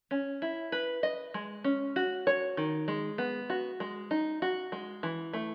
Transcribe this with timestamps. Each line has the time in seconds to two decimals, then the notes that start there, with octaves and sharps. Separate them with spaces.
0.11 C#4
0.42 E4
0.72 B4
1.03 D#5
1.34 G#3
1.64 C#4
1.96 F#4
2.27 C#5
2.57 D#3
2.88 G#3
3.18 B3
3.50 F#4
3.80 G#3
4.11 D#4
4.42 F#4
4.72 G#3
5.03 E3
5.33 A3